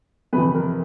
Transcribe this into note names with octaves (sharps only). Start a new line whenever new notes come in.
F2 C3 E3 B4
A#4